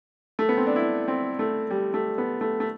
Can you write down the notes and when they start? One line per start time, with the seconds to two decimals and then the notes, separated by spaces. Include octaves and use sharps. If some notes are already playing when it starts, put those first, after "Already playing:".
0.39 A3
0.49 B3
0.58 C4
0.67 D4
0.76 E4
1.08 C4
1.39 A3
1.70 G3
1.94 A3
2.18 B3
2.41 A3
2.60 A3